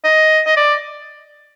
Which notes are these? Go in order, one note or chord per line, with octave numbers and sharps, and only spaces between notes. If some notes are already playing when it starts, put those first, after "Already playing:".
D#5
D#5
D5